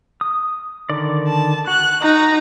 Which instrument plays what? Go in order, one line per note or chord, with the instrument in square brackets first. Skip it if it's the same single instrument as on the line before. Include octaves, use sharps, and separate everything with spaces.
[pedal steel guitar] D#6
D3 D#3 D5
[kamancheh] A5
[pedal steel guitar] F#4 [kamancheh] F#6
[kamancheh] D#4 A#5